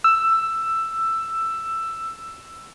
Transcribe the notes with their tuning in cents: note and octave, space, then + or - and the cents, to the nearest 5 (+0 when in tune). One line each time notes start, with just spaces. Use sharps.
E6 +10